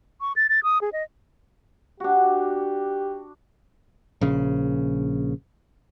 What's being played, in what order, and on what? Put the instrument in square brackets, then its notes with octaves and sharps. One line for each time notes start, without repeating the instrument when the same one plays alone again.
[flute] C#6
A6
A6
D#6
G#4
D#5
[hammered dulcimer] D4 F#4 [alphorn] G4
[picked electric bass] A#1 C#3